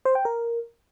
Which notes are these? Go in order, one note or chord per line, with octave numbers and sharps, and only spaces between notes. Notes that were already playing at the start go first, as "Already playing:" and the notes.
C5
G5
A#4